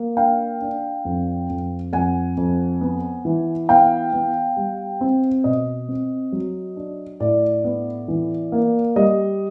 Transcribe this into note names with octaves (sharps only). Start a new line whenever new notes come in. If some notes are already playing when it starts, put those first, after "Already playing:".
Already playing: A#3
D4 F5 G5
D4
F2
F2
F2 F#5 G#5
F2
B3
E3
B3 F5 G5
B3
G3
C4
B2 D#5
C4
F#3
D4
A2 D5
B3
E3
A#3
G3 D#5